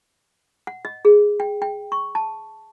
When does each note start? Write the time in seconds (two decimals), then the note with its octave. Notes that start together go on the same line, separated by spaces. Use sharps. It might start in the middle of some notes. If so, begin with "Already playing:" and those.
0.67 F#5
0.85 D#5
1.05 G#4
1.40 G5
1.62 G5
1.92 C#6
2.15 A5